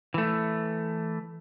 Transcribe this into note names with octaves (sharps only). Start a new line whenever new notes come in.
E3 A3